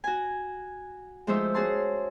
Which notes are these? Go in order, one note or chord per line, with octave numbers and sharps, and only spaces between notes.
F#4 G#5
F3 G#3 A3 D#4 C5 E5
C#4 F#4 G#4 A5 C6